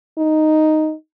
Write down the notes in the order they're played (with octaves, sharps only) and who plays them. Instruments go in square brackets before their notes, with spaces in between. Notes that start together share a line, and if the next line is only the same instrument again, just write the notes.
[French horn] D#4